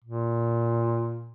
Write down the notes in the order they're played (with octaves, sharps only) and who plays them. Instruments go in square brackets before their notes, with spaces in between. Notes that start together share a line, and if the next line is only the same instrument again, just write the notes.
[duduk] A#2